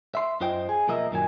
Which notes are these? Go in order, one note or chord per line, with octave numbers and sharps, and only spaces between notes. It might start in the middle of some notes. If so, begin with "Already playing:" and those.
E5 C6
F#2 F4 C5 D#5 G5
G#4
B1 F3 A#3 A#4 D#5 E5
F#2 A#2 D#3 F#3 G#5